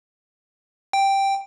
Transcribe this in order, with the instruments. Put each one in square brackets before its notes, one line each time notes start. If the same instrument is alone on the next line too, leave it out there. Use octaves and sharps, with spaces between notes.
[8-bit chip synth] G5